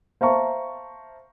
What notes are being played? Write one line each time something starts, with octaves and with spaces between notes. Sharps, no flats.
C5 E5 F5 A5 A#5 C#6